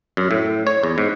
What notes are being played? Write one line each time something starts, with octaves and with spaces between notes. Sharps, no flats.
F#2
A2
C#5
E2
G#2